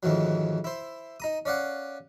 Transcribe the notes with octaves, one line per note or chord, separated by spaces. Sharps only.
F2 G#2 D#3 E3 F#3
E4 C5
D#4 A#5 D#6
C#4 D5 F5 F#5